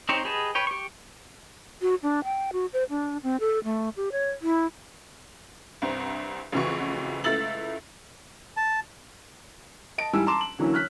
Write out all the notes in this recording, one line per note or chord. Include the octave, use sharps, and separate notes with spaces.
C4 D#4 G4 C5 C#5
G4 G#4 B4 D#5 A5
B4 C#5 G5
G4 C#6
F#4
D4
G5
F#4
C5
D4
C4
A4
A3
G4
C#5
E4
C2 G2 C4
A1 F2 C#3 E3 F#4 C#6
C#2 A3 E4 E6 A6 F#7
A5
D#5 A5 D7
G#2 E3 G3 E4 G#5 E6
A5 A#5 C6 D6 E7
F#7
D3 E3 F#3 A#3 C#4 E4
C#5 F6 F#6 B6